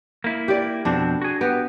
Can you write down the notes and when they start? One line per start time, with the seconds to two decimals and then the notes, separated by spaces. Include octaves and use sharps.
0.24 A#3 E4
0.48 G4 D5
0.85 F2 B2 C4 D4
1.22 F#4 G#4
1.41 B3 F#4 G4